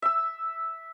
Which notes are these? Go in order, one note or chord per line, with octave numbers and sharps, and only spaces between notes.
E5 E6